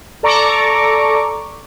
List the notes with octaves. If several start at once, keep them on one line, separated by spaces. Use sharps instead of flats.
A4 D5 A#5 C#6 D6